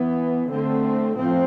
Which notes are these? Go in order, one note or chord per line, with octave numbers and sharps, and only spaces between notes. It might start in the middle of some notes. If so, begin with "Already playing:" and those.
Already playing: E3 B3
D3 A3 C4
A2 F3 C4